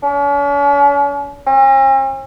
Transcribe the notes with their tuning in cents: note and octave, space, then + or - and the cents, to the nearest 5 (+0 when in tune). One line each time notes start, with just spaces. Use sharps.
C#4 +45
C#4 -45